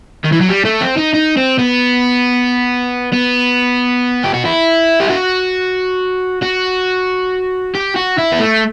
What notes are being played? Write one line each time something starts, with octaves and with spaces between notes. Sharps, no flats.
D#3
E3
F#3
G3
A3
C4
D#4
D#4
C4
B3
B3
G4
F#4
E4
G4
F#4
F#4
G4
F#4
E4
B3
A3